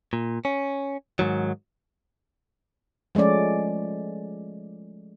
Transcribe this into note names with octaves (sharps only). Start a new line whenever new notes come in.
A#2
C#4
G#2 D#3 F#3
F3 G#3 A3 C#4 D5